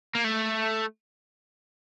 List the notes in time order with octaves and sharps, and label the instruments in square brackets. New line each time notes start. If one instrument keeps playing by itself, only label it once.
[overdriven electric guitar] A#3
A3